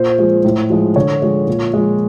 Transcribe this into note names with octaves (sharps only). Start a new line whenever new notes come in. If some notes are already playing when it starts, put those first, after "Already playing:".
Already playing: A#2 C5
F3 G#3
A2
F3 G#3
D3 C#5
F3 G#3
A#2
F3 G#3